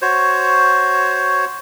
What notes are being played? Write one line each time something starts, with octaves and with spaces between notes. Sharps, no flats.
F#4 C5 C#5